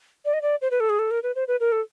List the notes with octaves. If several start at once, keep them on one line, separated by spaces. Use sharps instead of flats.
D5
D#5
D5
C5
B4
A4
G#4
A4
A#4
B4
C5
B4
A#4
A4